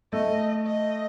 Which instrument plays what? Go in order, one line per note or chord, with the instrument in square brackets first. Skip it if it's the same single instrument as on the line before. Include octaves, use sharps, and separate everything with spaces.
[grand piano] A3 [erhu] D#5
[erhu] D#5